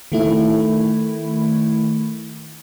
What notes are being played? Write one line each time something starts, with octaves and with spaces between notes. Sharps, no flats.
D#3 A3 E4